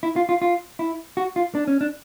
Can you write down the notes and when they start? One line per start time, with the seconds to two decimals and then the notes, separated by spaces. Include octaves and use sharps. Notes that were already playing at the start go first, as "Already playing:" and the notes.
0.03 E4
0.16 F4
0.29 F4
0.42 F4
0.79 E4
1.17 F#4
1.36 F4
1.55 D4
1.67 C#4
1.81 D4